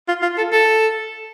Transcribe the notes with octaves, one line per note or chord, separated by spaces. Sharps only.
F4
F4
A4
A4